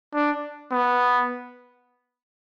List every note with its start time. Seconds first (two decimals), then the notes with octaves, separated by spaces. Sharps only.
0.14 D4
0.72 B3